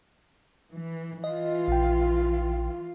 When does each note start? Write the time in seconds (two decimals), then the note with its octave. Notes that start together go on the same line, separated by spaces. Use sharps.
0.74 E3
1.24 E3 F4 D#5
1.68 A#1 G5